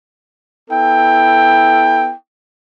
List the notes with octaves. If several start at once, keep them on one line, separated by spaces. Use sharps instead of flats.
B3 E4 A4 G5